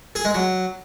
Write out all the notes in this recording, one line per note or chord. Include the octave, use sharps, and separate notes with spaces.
G#4
G#3
F#3